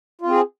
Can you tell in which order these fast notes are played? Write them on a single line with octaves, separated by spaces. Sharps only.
F4 C4 G#4